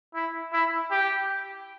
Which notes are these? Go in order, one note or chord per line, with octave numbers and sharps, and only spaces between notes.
E4
E4
G4